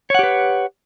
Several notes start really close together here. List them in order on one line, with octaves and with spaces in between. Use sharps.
C#5 F#5 G4 B4